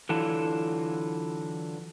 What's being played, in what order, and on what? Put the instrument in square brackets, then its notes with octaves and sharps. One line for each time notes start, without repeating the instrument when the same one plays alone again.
[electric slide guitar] D3 E3 F#3 F4 A4